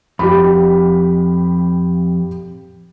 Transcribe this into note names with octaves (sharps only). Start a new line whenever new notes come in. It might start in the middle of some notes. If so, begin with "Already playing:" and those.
F2 G4 B5